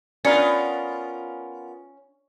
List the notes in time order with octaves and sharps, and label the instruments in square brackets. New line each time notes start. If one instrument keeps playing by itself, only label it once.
[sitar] B3 F4 A#4 [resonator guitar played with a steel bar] C#4 [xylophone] D5 C#7